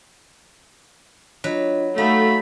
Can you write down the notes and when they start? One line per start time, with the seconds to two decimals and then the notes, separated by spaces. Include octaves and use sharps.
1.44 F#3 D4 F4 B4 D#5
1.98 A3 D#4 F#4 F5 F#5 B5